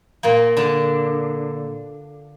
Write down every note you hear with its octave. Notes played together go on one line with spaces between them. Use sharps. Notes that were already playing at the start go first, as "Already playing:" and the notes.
A#2 A#3
D3 D4